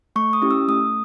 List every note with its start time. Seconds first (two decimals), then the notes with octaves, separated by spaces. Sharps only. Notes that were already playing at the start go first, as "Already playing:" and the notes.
0.16 A3 C#6
0.33 D#6
0.42 C#4 E4 G4
0.51 E6
0.68 A3 D#6